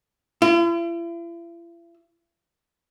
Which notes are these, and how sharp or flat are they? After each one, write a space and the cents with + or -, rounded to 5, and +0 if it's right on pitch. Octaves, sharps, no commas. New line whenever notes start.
E4 +45